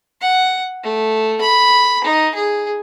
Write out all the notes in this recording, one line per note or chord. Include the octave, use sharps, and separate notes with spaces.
F#5
A3
B5
D#4
G#4